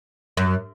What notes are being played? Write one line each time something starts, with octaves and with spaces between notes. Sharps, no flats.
F#2